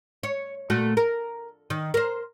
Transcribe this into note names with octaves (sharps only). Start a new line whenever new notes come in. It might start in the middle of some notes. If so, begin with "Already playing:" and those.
C#5
A#2 A3 F#4
A#4
D#3
A#4 C5